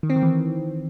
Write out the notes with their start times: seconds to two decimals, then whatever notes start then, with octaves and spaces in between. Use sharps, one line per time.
0.03 D#3
0.10 C4
0.16 D#3
0.23 E3